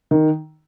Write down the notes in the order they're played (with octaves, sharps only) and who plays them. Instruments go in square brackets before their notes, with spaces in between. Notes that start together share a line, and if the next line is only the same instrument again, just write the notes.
[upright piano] D#3